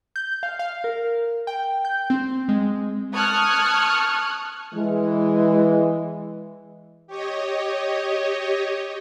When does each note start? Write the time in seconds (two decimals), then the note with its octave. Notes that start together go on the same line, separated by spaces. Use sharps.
0.16 G6
0.43 F5
0.59 F5
0.84 A#4
1.47 G5
1.85 G6
2.10 C4
2.49 G#3
3.14 A5 C#6 D#6 F6 F#6 G#6
4.74 E3 G#3
7.07 G4 C#5 D#5